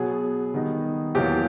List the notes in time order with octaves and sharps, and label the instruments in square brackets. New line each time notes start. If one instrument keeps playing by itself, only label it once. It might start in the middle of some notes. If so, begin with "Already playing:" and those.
Already playing: [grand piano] B2 F#3 B3 G#4
D#3 G3 B3 D#4
E2 B2 F#3 A#3 G4